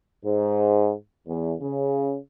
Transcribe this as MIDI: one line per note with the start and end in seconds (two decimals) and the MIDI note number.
0.24 0.92 44
1.28 1.53 40
1.61 2.17 49